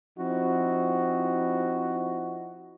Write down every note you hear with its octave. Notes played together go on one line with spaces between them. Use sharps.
F3 C4 D#4 E4 F#4